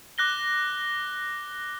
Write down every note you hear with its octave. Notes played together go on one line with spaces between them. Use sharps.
D6 F#6 A#6 G7